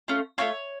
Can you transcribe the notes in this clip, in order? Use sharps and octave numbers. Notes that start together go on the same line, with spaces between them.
A3 C#4 F4
A3 C#4 F4 C#5